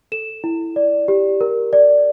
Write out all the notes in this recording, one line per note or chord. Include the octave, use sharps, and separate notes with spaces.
A4 E7
E4
D5
G4
A#4
D5